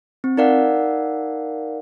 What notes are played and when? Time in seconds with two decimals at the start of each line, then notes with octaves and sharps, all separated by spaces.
0.24 C4
0.37 D#4 A#4 D5 F5 F#5